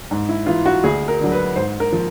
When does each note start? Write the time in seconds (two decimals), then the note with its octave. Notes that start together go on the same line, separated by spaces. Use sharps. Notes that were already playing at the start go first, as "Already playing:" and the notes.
0.11 G#2
0.29 E4
0.47 E3 F4
0.66 F#4
0.84 D2 G#4
1.08 A#4
1.19 D3 F#3
1.32 B4
1.56 G#2 C5
1.80 A#4
1.93 F3